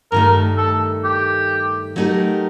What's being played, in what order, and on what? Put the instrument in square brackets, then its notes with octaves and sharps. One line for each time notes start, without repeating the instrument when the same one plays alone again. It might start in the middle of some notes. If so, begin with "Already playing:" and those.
[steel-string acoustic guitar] G2 D#3 A3 [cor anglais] A#4
[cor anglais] A4
G4
[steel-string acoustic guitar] F#3 A3 D#4 G4 A#4